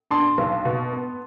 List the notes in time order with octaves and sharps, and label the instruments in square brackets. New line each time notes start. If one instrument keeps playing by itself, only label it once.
[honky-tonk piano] D4 [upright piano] A5 C6
[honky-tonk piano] B1
B2
B3